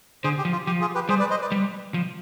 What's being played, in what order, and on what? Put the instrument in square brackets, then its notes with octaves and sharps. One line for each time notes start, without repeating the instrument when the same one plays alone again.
[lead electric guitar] D3 [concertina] G#4 C5
[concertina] G4
[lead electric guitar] F3
[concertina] F4
[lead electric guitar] F3 [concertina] G4
[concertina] F4 G#4
G4 B4
[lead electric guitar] G3 [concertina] G#4 C5
[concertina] B4 D5
C5 D#5
B4 D5
[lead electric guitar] G3
F3